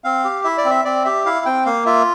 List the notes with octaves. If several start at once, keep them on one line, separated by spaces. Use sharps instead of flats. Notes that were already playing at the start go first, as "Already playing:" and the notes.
C4 F5
G4
E4 E5
D5
C4
E5
C4 D5
G4 E5
E4 F5
C4 G5
A#3 F5
F4 E5